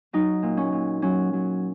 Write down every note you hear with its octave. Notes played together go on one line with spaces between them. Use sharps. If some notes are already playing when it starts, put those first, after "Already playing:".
F#3 D#4
A#2
C#4
A#2
F#3 C#4
F#3